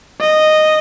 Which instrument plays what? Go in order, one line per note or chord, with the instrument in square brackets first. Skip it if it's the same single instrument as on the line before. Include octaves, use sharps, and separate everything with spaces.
[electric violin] D#5